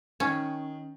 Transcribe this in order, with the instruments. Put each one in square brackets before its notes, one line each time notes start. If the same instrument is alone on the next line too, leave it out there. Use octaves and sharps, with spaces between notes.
[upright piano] D#3 [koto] C#4